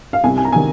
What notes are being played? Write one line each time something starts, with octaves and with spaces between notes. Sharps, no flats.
F5
C2 G#5
G#5
A#5
C3 D#3 G#5